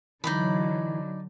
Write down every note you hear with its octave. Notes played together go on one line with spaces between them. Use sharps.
D3 E3 F#3 D#4 D5 B5